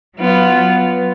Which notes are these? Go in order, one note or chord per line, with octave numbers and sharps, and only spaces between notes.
F#3 B3 F4